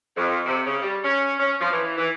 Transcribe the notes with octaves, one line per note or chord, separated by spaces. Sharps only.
F2
C3
C#3
G3
C#4
C#4
F3
E3
E3